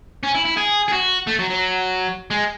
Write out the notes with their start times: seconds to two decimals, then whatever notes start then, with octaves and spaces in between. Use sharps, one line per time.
0.23 C#4
0.35 E4
0.45 E4
0.57 G#4
0.88 G#4
0.93 F#4
1.27 A3
1.39 F#3
1.50 F#3
2.31 G#3